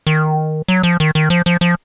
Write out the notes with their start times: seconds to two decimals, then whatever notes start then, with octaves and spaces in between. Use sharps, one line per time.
0.07 D#3
0.68 F#3
0.83 F3
1.00 D#3
1.15 D#3
1.30 F3
1.46 F3
1.61 F3